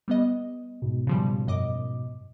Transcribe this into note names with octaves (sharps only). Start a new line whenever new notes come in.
G3 B3 D#5
G#2 B2
C#3 F3 G3
F#2 D#5 D6